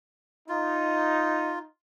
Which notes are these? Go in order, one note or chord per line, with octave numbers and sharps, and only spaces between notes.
D#4 F4